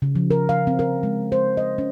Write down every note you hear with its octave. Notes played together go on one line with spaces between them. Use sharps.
C#3
F3
A#4
F5
C4
A#4
G#3
C5
D#5
C#4